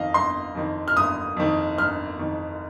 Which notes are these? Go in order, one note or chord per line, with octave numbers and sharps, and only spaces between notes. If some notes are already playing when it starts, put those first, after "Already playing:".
Already playing: F2 D#3 D#5 F5
G1 C6
F2 D#3
F6
G1 D#6
F2 D#3
G1 F6
F2 D#3